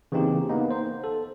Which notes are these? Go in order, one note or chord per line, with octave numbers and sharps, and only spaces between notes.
C#3 E3 A#3 C4 D#4 G4
A#3 B3 D#4
C5
A4